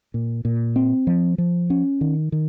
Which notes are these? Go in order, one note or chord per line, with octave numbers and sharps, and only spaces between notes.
A#2
A#2
C4
F3
F3
C#4
D#3
D#3